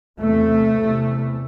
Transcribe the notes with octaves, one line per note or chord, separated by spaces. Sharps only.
E2 C3 A3
E2 C3